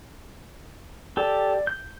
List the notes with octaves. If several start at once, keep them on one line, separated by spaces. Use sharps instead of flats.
G4 A4 D5
G6